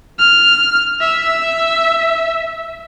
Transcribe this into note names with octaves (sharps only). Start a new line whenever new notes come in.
F6
E5